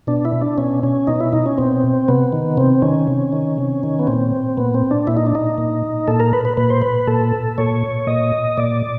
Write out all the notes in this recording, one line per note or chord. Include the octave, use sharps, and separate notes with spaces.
B2 D4
E4
D4
B2 C#4
C#4
B2 D#4
E4
D#4
C#4
B2 C4
C3 B3
D#3
C3 C4
D#3 C#4
C3
D#3
C3
D#3
B3
A#2 C4
A#2 B3
C4
D4
A#2 E4
D#4
D4
D#4
A#2
A#2 A4
A#4
B4
B4
A#2 B4
C5
B4
A#2 A4
A#2 C#5
A#2 D#5
A#2 D5